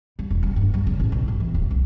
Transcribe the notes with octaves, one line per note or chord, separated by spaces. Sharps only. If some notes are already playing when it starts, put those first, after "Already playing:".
G3
E1
G3
G2
G3
C#3
A1
B1
G1
E3
D1
C2